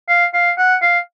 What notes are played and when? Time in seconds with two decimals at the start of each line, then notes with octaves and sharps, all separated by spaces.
0.09 F5
0.34 F5
0.58 F#5
0.82 F5